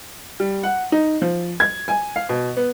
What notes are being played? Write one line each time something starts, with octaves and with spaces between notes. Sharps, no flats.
G3
F#5
D#4
F3
G#6
G#5
F5
B2
B3